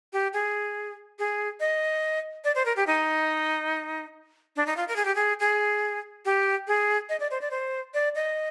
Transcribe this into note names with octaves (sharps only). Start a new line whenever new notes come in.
G4
G#4
G#4
D#5
D5
C5
A#4
G4
D#4
D4
D#4
F4
A#4
G#4
G4
G#4
G#4
G4
G#4
D#5
D5
C5
D5
C5
D5
D#5